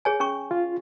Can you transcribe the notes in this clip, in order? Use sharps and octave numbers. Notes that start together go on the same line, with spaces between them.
G#4 C#5 G#5
C#4 G#4 C#6
F4